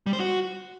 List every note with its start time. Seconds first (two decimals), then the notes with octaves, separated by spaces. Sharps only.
0.06 G3
0.13 C5
0.20 F#4